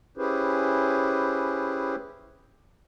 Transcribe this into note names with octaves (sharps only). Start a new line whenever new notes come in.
C#4 E4 G4 G#4 B4 C5